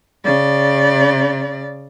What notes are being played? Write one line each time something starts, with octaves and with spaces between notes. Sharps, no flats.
C#3 D5